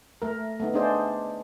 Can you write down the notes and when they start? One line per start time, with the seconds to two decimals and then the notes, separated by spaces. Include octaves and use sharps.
0.22 A3 A#4
0.60 A3 B3 D#4
0.74 D4 D#4 G#4 C5 D5